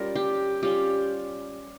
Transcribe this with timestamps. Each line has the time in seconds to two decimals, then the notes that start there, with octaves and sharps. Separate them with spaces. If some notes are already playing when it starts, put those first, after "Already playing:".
Already playing: G3 C#4 F4 A#4
0.15 G4
0.63 G3 C#4 F4 G4